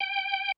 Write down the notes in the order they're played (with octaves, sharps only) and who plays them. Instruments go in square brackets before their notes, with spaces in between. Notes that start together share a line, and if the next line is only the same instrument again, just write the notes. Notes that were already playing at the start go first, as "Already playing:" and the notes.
[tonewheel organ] G5